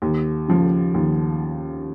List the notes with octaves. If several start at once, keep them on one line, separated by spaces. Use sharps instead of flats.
D#2
C#3 F3
D#2